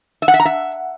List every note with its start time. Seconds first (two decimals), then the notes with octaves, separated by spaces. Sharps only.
0.22 E5
0.28 F#5
0.34 E5
0.40 A#5
0.45 E5